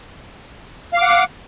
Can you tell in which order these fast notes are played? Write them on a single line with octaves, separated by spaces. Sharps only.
F5 D6 F#5